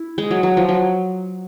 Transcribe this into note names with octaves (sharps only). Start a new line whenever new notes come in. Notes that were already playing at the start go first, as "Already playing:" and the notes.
Already playing: E4
G#3
F#3
F#3
F3
F#3